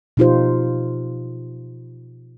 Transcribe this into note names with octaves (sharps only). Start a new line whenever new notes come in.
B2 F3 D#4 F4 G4 C5